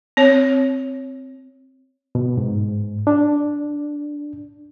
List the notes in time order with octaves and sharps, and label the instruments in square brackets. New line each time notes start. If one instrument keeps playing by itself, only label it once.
[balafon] C4 C#5
[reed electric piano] B2
G#2
D4